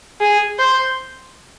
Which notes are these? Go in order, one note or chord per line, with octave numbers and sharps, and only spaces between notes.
G#4
C5